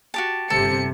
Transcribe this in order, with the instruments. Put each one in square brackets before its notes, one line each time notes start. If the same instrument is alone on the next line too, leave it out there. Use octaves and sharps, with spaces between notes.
[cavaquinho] F#4 G4 A5
[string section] G1 C3 C#7 [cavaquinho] A4